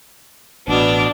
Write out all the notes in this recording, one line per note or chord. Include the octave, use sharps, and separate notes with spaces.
A1 B2 B3 D4 D6 E6 F6